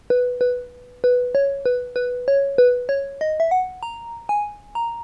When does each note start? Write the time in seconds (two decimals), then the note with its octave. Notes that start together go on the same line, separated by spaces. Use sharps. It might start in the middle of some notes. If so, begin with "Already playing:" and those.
0.10 B4
0.41 B4
1.04 B4
1.35 C#5
1.66 B4
1.96 B4
2.28 C#5
2.58 B4
2.89 C#5
3.21 D#5
3.40 E5
3.51 F#5
3.83 A#5
4.29 G#5
4.75 A#5